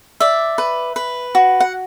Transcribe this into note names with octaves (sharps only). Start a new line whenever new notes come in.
D5 E5
B4
B4
F#4
F#5